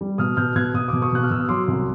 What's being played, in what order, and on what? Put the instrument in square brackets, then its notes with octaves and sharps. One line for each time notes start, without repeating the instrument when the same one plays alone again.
[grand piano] G3
B2 D#6 F6
B2 F6 G6
B2 F#6 G#6
B2 D#6
B2 D6
C#6 D#6
B2 F#6
F6
B2 E6
D#6
F#3 C6 D6
C2